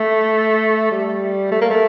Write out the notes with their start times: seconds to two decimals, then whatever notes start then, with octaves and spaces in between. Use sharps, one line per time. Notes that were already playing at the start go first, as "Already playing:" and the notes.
Already playing: A3
0.92 G3
1.51 A3
1.61 A#3
1.71 A3